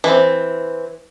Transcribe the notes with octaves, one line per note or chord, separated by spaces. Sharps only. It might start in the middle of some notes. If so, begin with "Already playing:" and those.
E3 C4